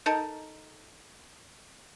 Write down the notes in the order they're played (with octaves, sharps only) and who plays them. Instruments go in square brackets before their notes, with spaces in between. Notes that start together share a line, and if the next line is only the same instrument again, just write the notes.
[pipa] D#4 A4 A#4